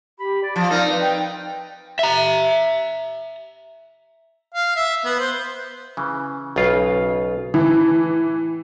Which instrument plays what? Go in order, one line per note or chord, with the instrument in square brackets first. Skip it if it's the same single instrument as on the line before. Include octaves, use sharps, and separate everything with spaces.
[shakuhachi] G4 [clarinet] B5
[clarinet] D5
[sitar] F3 [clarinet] D5 [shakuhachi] A5
[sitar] C4 D#4 [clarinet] A#4 [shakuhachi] D5
[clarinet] B4
[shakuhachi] G5
[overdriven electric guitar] E5 A#5
[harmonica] F5
E5
B3
C5
[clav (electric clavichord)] C#3 E3
B1 C#3 F4
[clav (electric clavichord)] A2 [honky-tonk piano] E3